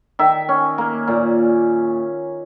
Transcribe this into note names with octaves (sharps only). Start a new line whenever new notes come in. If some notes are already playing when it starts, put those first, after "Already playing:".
D#3 E5
C#4
A#3
A#2